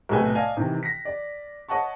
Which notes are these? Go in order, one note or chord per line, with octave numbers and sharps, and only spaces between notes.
B1 A2 C3 A3 B4 G#5
D5 D#5 F5 G#5 A5
C3 D#3 E3
A#6 B6
D5
C#5 D#5 F#5 A5 C#6